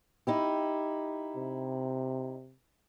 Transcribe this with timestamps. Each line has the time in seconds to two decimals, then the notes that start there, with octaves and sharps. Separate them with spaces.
0.27 D#4 E4 G4
1.36 C3